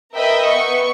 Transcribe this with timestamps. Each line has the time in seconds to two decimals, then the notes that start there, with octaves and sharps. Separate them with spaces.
0.14 A#4 B4 D#5 E5 G5 B5
0.46 B3 B4 C#6 C#7